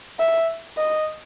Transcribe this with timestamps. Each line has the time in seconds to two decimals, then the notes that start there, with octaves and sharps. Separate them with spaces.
0.19 E5
0.77 D#5